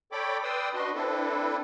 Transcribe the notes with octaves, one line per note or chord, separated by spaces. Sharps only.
A4 C#5 D5 G5 B5 D6
B4 D5 G5 C6 D#6 E6
D4 F#4 B4 D#5 C6
C4 D4 E4 A4 B4